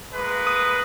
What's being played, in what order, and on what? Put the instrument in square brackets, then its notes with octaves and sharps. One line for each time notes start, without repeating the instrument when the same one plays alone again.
[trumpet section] G#3 A#3 B4
[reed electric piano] D#6